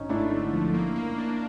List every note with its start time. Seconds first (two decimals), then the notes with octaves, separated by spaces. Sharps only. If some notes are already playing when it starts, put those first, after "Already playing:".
Already playing: G#1 C#4 D#4
0.09 A3 D4 E4
0.31 D3
0.53 F3
0.74 A#3
0.96 A#3
1.18 D4